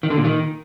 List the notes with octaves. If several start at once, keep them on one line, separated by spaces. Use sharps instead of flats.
D#3
D3
A#2
D#3